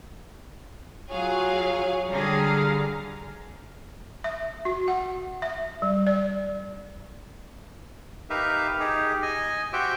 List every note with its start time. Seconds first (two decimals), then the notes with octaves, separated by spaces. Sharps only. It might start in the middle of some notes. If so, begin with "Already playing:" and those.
1.10 F#3 F4 G#4 C#5 F5
2.10 D3 G3 G#4 F5 A#5
4.24 E5
4.65 F#4
4.88 F#5
5.42 E5
5.82 G3
6.07 D5
8.30 D#4 G4 A#4 B4 E5 F5
8.79 D#4 G4 G#4
9.23 D#5 G#5
9.73 F#4 G4 C5 E5 G5